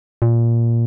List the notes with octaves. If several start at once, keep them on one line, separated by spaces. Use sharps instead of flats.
A#2